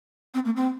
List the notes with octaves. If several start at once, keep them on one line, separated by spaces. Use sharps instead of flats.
C4
A#3
C4